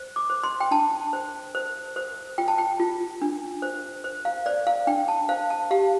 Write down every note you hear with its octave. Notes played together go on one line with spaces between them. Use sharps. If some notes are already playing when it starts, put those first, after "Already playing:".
Already playing: C5
D6
C5
C6
G5
D4 A5
C5
C5
C5
F4 G5
A5
G5
F4
D4
C5
C5
F5
C5 D5
F5
D4 G5
A5
C5 F5
A5
G4 F5